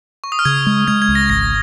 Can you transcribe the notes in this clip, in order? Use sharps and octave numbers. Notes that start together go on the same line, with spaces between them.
C#6
D#6
F6
C#3 G#6
G#3
G#3 G#6
G#6
C#2
A#6
G#1 A#6